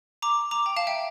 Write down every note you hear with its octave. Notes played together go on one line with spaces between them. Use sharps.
A#5 D6
A#5 D6
G5 A#5
F5 A5
E5 G5